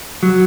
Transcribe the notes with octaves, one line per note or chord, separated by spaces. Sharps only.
F#3